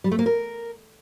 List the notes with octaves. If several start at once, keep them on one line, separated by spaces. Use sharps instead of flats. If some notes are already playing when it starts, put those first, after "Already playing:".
G3
A3
A#3
A#4